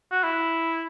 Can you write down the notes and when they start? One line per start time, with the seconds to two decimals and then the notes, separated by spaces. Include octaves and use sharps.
0.11 F#4
0.23 E4